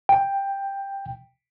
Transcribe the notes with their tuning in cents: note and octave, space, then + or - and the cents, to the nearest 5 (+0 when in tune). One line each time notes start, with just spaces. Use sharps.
G5 +10